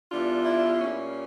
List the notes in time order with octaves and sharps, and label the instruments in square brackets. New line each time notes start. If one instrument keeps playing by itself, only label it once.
[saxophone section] E2 E3 G3 D4 F4
[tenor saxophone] E4
[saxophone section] A#2 G3 C#4